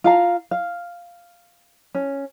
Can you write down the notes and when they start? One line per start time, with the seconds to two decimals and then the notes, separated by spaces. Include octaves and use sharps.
0.04 F4 F5 A#5
0.51 F5
1.95 C#4